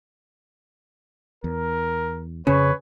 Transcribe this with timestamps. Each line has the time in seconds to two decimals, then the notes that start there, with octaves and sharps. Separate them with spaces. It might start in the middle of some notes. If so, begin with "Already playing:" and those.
1.44 E2 A#4
2.47 F2 C#3 C#4 B4 C#5